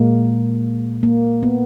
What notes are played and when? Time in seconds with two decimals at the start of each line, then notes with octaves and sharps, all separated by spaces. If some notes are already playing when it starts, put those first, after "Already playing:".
Already playing: A#2 G#3 A#3
1.03 A#3
1.43 B3